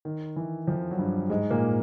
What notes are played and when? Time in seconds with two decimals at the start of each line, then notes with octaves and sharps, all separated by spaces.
0.05 D#3
0.36 E3
0.67 F2 F3
0.91 F#3
0.98 G2 G3
1.30 G#2 G#3
1.50 A#2 A#3